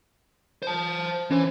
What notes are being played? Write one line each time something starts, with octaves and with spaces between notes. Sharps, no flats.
C5 A5
E3 C#4 C5